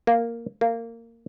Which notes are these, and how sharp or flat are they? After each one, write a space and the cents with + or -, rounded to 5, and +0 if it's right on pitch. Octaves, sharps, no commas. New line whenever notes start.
A#3 -5
A#3 -20